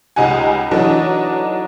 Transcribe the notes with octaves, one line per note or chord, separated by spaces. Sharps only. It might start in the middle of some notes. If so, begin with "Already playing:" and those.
C#2 D#4 G4 F#5 G#5
E3 F#3 D4 D#4 A4 D#5